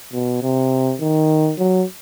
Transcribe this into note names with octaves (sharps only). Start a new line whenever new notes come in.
B2
C3
D#3
F#3